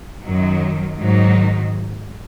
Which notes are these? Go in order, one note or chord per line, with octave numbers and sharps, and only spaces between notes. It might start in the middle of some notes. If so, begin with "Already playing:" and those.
F#2 D#3 F#3
G#2 D#3 F#3 D#4